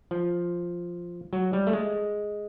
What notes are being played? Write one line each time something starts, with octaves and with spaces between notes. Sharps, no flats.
F3
F#3
G3
A3
G#3